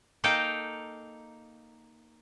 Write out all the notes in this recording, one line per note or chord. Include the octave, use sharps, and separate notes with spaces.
A#3 D#4 A4 F5 G5